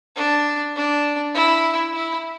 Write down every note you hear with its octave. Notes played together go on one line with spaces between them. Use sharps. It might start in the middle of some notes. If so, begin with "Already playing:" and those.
D4
D4
E4
E4